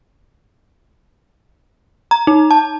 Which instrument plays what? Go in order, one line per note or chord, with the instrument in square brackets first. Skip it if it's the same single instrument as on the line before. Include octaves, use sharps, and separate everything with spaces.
[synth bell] A#5
D#4
A5